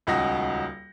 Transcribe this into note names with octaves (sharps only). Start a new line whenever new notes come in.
D#1 C#2 D#4 F#4 D#6 A#6